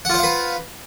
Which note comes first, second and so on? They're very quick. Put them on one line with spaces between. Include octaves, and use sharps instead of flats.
F#5 F4 C5 F5 B4